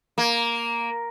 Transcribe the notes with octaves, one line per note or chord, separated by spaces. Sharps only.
A#3